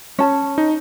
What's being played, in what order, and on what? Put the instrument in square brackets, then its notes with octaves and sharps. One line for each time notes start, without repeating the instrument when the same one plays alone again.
[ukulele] C#4 A5
[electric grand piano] D#4